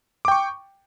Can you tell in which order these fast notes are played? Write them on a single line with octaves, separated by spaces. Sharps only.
D6 G5 C#6